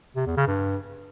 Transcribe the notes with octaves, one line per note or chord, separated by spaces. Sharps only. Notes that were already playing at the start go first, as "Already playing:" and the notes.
C3
E2
C#3
G2